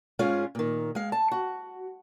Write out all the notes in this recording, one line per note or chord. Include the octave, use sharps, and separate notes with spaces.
G#2 G#3 C#4 F4 G#4 F5
A#2 D#3
G#3 F5
A5
F#4